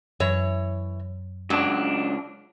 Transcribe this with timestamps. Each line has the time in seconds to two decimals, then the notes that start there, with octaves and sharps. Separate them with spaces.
0.20 F#2 E3 C#5
1.50 C#2 F#3 D4